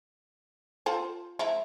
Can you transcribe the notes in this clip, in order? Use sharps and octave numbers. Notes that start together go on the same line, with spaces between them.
F4 A4 C5
F3 G#3 E4